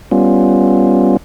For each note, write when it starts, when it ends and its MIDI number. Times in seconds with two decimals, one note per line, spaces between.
0.11 1.17 55
0.11 1.17 59
0.11 1.17 61
0.11 1.17 65